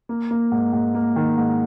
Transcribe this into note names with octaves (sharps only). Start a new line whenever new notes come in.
A#3
A#3
G#2
G#2
A#3
D#3
G#2